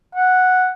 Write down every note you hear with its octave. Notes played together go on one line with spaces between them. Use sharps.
F#5